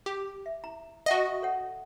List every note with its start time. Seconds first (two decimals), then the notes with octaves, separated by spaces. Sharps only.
0.06 G4
0.46 E5
0.64 E4 A#5
1.06 F#4 D#5 E5 F#5 A5
1.42 A4 C#5 F#5